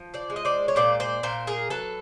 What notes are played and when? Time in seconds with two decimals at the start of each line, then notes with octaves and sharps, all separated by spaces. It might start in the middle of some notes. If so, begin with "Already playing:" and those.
Already playing: F3
0.14 C5 D5
0.30 G#3
0.36 D#5
0.45 C5 D5
0.68 C#5
0.76 A#2 C5 D5
1.00 C5 D5
1.23 A#2 A#4 C5
1.47 G#4 A#4
1.70 F#3 A4 B4